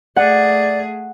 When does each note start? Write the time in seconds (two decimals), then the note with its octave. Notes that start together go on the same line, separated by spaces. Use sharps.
0.16 A3 G#4 D5 F#5